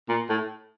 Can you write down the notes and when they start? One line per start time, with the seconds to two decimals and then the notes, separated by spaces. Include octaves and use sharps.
0.09 A#2
0.29 A2